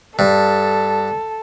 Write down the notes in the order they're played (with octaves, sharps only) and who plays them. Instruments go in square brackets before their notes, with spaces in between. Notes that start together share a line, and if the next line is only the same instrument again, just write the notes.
[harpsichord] G2 [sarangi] A4